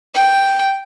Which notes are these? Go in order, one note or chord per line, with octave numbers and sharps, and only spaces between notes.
G5